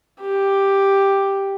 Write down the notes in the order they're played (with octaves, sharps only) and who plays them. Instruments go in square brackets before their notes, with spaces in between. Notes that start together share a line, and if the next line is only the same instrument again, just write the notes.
[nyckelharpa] G4